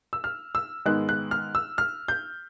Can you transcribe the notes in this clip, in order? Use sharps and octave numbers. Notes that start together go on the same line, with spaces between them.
E6
F6
E6
G#2 D#3 G#3 B3 F#6
F#6
F6
E6
F6
G6